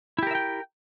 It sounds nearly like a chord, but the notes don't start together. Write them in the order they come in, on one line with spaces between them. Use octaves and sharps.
E4 G4 A#4 E5 G5